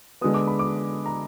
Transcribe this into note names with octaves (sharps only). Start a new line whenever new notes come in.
D3 G#3 B3 D#6
D6
B5
D6
A#5